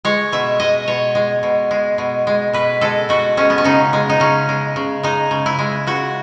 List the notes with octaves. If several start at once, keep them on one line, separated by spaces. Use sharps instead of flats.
G#3 C#5
B2 E5
G#3 D#5
B2 C#5
G#3
B2
G#3
B2
G#3
B2 B4
G#3 A4
B2 F#4
G#3 C#4
B3
C#4
C#3 D#4
G#3
D#4
C#3 C#4
G#3
C#3
G#3 D#4
C#3
E4
G#3
C#3 F#4